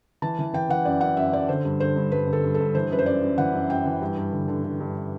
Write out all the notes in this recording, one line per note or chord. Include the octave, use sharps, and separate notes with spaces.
E3 A5
E3
E3 G5
E3 F#5
F#2 D5
F#2 F#5
F#2 E5
F#2 D5
D3 C5
G2
D3 C5
G2
G2 B4
D3
A4
G2
A4
G2
E3 C5
F#2 B4
C5
F#2 D5
F#2
E3 F#5
F#2
F#2 G5
E3
G2
G2
D3
D3
D3
G2